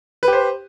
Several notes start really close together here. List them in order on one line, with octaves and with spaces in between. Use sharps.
B4 G4 C5